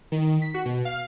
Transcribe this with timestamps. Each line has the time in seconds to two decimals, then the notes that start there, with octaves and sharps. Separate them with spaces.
0.12 D#3
0.42 B6
0.54 F#4
0.66 B2
0.85 F5